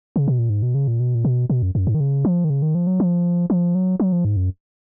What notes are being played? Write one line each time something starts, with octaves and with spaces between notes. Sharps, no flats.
C#3
B2
A#2
G#2
B2
C#3
A#2
B2
A#2
B2
B2
F#2
F#2
G#2
D#3
C#3
F3
D#3
C#3
D#3
F3
F#3
F3
F3
F#3
F#3
F3
G#2
F#2